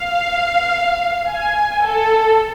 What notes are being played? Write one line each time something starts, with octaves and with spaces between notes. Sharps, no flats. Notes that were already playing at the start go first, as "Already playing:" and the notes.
Already playing: F5
G#5
A4